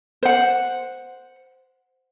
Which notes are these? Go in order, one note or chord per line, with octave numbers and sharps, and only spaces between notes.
C5 F#5